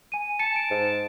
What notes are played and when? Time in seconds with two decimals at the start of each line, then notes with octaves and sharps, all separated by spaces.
0.12 G#5 D#7
0.39 A5 C#7
0.56 D7
0.71 G#2